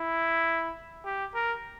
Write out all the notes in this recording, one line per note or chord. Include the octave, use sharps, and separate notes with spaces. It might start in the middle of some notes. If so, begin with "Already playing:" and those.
Already playing: E4
G4
A#4